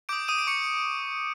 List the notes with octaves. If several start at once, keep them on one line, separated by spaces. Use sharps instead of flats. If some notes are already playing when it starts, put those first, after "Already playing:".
D6 D#6 G6 D7
D#6 D#7
D7
C#6 C#7